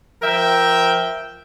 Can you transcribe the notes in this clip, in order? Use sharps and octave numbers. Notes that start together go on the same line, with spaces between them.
F3 A#4 E5 G5